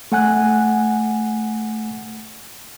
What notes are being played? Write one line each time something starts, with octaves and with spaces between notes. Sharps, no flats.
A3 F#5 G#5 F#6